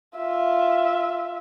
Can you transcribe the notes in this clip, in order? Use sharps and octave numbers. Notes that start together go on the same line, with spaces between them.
F4 E5